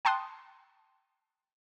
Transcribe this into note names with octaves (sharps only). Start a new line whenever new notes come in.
G5 A5 C6 D#6 F#6